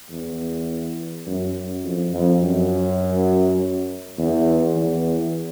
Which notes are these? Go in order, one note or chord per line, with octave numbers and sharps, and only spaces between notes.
E2
F#2
F2
F2
F#2
E2
E2